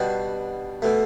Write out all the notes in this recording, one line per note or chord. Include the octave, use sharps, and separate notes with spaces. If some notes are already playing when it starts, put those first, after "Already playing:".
Already playing: B2 G3 D4 F#4
B2 A3